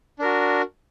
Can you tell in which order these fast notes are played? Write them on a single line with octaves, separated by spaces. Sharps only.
D4 A#4 F#4